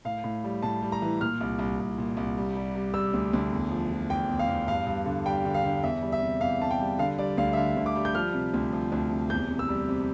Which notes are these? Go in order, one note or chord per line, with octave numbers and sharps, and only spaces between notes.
A2 F5
A2
G3
A2 A5
G3
A#5
E3
A#2 F6
C2
C2
C2
A#2
C2
G3
G3
G3
G3 E6
D2
D2
E2
F3
F3
E2 G5
E2
F5
E2
G2 F5
G2
D3
G3 G5
D3
F5
D3
E2 E5
G3
E5
C3
E2 F5
C3 A5
G5
G3
D3 F5
G3 D5
D2 F5
E5
D3 F5
D2
D6
G3
G6
F3 F6
C3
D2
F3
D2
C3
E2 G6
C3
E6
G3
C3